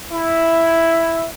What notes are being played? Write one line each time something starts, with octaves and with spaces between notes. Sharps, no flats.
E4